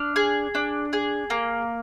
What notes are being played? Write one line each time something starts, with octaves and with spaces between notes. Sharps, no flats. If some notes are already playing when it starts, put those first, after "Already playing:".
Already playing: D4 F6
G#4
D4
G#4
A#3